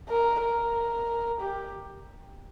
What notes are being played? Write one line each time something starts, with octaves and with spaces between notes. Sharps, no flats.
A#4
A#4
G4